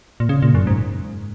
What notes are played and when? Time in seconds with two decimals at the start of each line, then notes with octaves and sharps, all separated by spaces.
0.20 A#2
0.29 C#3
0.42 A#2
0.55 F#2
0.67 G#2